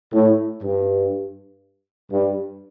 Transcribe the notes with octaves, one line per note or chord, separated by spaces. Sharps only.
A2
G2
G2